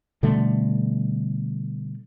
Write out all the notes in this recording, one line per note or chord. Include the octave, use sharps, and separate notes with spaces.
B2 D3 G3 A3